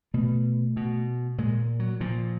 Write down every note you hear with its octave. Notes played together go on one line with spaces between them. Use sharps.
B2 A3
B2
A#2 G#3
F#3
A#2 F3